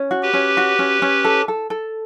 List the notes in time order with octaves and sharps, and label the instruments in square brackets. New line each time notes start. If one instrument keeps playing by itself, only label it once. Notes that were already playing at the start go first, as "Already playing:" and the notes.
Already playing: [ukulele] C#4
F#4
[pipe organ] G4 B4
[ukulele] C#4
F#4
C#4
C#4
A4
A4
A4